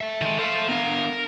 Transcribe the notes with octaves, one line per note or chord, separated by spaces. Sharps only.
A4 E5
D#3 G#3
A4 C5 E5 F5
B3 D4 A#4 F5